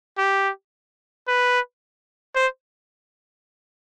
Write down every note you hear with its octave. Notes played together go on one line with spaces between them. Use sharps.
G4
B4
C5